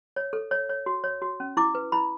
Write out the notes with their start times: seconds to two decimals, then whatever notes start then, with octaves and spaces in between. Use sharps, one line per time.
0.16 C#5
0.33 A4
0.51 C#5
0.69 C#5
0.86 F#4
1.04 C#5
1.22 F#4
1.40 C#4
1.57 E4 D6
1.75 B4
1.92 E4 B5